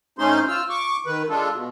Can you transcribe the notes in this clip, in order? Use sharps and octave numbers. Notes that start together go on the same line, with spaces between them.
A2 A3 C#4 D#4 C5 C6
F4 E6 F6
C#6 D6
D#3 B4
G#3 D4 F4 A4
B2